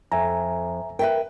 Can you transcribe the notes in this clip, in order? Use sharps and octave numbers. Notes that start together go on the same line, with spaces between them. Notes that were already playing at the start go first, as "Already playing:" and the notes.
F2 E5 G#5 A#5
A#4 B4 E5 G5